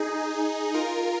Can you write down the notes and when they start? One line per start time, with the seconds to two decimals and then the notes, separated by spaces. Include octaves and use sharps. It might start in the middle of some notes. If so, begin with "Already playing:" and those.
Already playing: D#4 G#4
0.74 F4 A#4